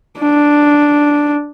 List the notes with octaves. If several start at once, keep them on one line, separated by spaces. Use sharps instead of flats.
D4